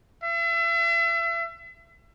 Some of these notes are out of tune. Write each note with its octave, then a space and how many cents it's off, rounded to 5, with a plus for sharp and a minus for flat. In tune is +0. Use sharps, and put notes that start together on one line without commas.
E5 +35